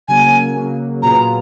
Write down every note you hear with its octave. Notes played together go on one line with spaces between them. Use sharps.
C#3 F#3 A#3 G#5
C#3 F#3 A#3
A#2 F#3 B3 F4 G#4 A#5